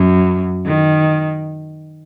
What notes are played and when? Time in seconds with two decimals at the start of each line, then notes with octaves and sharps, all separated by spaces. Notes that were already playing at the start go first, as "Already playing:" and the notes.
Already playing: F#2
0.66 D#3